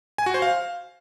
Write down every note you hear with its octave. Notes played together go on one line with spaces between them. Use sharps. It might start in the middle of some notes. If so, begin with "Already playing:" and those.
G#5
F#4
C5
F5